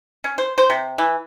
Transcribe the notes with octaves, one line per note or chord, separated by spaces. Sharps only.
C#4
C5
C5
C3
E3